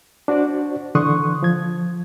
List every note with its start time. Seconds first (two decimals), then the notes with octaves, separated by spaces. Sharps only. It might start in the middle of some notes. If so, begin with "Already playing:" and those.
0.28 D4 F#4 C5 D5
0.95 D3 E3 C6 C#6 D#6 F#6
1.43 F3 G#6